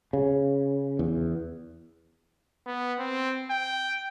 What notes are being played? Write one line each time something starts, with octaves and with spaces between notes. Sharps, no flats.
C#3
E2
B3
C4
G5